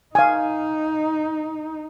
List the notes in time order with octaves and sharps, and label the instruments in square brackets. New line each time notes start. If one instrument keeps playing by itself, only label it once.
[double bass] D#4 [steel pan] F5 G#5